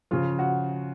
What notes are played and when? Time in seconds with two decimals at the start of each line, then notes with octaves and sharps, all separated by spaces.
0.11 C#3 F3 F4
0.39 F#4